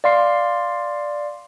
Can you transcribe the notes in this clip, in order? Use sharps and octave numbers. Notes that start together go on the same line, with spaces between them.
D5 F5 C6 C7